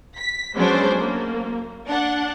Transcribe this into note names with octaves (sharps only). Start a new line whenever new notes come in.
B6
F#3 G#3 B3 C#4 D4 C5
A#3
D4 F#5